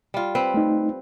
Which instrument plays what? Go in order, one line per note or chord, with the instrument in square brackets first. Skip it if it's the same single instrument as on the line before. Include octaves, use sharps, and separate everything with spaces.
[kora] G3 F4
C4 B4
[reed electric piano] A3 D#4